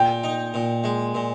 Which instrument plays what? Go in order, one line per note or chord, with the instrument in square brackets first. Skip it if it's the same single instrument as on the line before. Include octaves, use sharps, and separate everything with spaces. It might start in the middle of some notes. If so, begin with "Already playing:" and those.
Already playing: [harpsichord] A#2 [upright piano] G5
[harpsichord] D#4
A#2
G#3
A#2